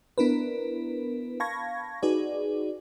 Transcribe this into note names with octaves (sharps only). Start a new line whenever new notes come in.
B3 D4 E4 A#4 B4
F5 A5 B5 C#6 G#6 A#6
D#4 F#4 G#4 B4 D5